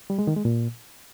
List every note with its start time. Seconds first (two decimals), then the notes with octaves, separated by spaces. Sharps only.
0.10 G3
0.19 G#3
0.27 D#3
0.36 G#3
0.45 A#2